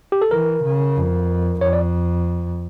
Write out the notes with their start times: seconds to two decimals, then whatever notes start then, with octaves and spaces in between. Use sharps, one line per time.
0.12 G4
0.22 A4
0.31 E3 A#4
0.64 C#3
0.96 F2
1.61 F2 C#5
1.73 D5